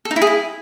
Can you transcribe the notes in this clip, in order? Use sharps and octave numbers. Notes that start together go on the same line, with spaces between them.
A4
D#4
E4
G#4
E4